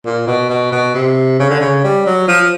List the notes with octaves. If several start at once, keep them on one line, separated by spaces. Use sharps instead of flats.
A#2
B2
B2
B2
C3
C#3
D3
C#3
G3
F#3
F3